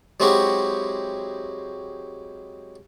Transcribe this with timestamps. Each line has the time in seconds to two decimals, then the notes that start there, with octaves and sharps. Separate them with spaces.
0.20 F#3 G#3 C4 E4 F#4 G4